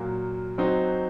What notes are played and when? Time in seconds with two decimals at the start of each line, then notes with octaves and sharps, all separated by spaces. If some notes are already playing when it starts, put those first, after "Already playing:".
Already playing: A#2 F#3 A#3 F#4
0.58 F#3 C4 D#4 F#4 C5